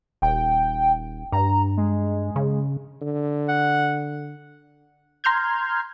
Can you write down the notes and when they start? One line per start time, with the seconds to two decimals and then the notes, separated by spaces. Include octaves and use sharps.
0.22 D#1 G5
1.32 G2 A#5
1.77 G#3
2.36 C#3
3.02 D3
3.49 F#5
5.24 A#5 C6 F6 G6 G#6